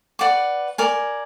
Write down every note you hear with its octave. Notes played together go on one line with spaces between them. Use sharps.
B4 D5 F#5 D6
A#4 D5 G#5